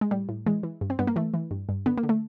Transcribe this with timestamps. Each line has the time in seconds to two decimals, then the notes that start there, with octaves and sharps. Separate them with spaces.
0.01 G#3
0.11 A2 G3
0.29 A2
0.46 E3 G#3
0.63 E3
0.81 G2
0.90 C4
0.99 G2 B3
1.07 A#3
1.16 E3 A3
1.34 E3
1.51 G2
1.69 G2
1.86 D3 B3
1.98 A#3
2.03 D3
2.09 A3